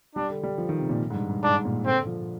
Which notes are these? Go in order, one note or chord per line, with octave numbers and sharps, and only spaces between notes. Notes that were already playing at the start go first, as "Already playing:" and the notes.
G3 D4
D3
G3
F3
D#3
C3
A#2
G#2
G2
G2
G#2 D4
A#2
D3 C4
F3